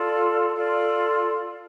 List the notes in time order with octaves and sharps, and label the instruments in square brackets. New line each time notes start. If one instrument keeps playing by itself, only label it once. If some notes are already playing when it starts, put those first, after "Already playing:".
Already playing: [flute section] F4 A4 D5
F4 A4 D5